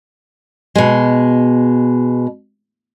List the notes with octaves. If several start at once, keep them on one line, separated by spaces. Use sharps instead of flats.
B2 G#3